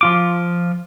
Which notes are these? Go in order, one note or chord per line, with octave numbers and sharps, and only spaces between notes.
F3 F4 D6